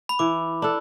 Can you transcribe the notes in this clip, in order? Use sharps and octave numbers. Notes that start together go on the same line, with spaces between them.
B5
E3 D6
D4 A4